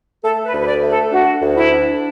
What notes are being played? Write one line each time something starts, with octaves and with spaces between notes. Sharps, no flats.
A3 A4
B4
D2
B4
D5
A3
A4
D4 F#4
D2
E4
D4